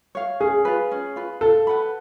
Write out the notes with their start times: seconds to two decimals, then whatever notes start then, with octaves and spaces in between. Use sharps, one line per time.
0.15 C#5 F5
0.40 C#4 G#4
0.65 F4 B4
0.91 C#4
1.16 F4 B4
1.41 F4 A4
1.67 B4 F#5 B5